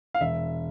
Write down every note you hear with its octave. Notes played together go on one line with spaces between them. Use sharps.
F5
E1 E5